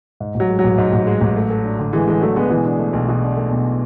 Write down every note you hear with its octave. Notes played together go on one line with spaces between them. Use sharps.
G#2
A1 F#3
G#3
F#3
A1
G#2
A1
G#3
A1
A3
A4
D4
D3
E3 G#3 A3
E3 G#3 A4
F#3 A3 D4
D3 G#3 B3
B2 E3 G#3
D4
A3
B1
B2
D4
A3
B1